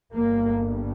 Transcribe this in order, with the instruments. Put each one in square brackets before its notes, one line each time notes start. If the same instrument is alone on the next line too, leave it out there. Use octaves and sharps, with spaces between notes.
[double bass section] G1 G2 A#3